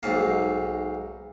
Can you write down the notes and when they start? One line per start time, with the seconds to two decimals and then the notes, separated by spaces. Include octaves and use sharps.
0.03 B1 G#2 A#3